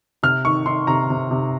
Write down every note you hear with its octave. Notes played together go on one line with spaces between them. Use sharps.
C3 F6
D#3 C#6
D#3 C6
C3 A#5
C3
C3